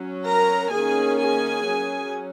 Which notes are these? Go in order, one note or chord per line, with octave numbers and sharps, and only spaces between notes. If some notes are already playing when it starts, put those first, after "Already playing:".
Already playing: F#3 C#4
A#4 A#5
D#3 A#3 C#4 G#4 G#5
G#4 G#5
F#3 C#4